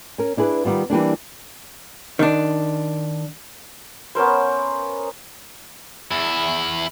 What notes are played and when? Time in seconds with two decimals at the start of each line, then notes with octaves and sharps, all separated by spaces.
0.18 C#4 A#4
0.37 D4 E4 G#4 B4
0.65 D#3 G3 B3 F4
0.90 E3 G3 A#3 D4
2.19 D#3 D4
4.15 B3 C#4 A#4 C5
6.11 E2 E4